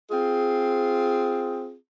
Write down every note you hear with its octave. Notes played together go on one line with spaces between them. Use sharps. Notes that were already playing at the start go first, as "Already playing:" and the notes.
C4 F4 G#4